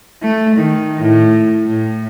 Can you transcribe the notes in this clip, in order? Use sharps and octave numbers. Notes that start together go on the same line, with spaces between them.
A3
D#3
A2
A2